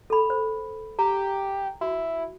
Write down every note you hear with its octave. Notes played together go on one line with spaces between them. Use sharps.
A4 B5
C5
G4 A#5
E4 F#4